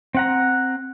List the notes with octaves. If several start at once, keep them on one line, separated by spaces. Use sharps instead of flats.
C4 F#5 A#5